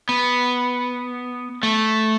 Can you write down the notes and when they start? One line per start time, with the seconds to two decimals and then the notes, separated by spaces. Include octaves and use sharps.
0.09 B3
1.63 A3